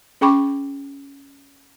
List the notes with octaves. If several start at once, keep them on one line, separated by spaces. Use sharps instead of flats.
C#4 G#4 G5 B5 C#6 D6